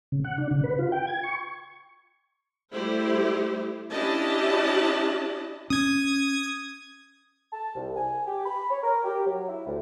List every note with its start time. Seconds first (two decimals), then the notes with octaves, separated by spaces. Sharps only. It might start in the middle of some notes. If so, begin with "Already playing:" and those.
0.12 C#3
0.24 F#5
0.38 D4
0.51 C#3
0.64 B4
0.79 F4
0.92 G5
1.07 G#6
1.23 C#6
2.74 G3 A3 E4 G4 C5
3.92 C#4 D4 E4 G4 D#5 A5
5.70 C#4 D#6 G#6
7.53 A5
7.75 C2
7.95 G#5
8.27 G4
8.45 B5
8.70 C#5
8.83 A#4
9.04 G4
9.26 F#3
9.48 E4
9.66 D2